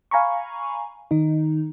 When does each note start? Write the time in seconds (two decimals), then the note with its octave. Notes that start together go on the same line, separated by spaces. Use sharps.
0.11 F5 G#5 A#5 B5 C#6
1.11 D#3 D#4